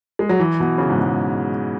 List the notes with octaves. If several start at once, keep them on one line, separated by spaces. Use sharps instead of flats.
G#3
F#3
E3
B2
C#3
G#2
B2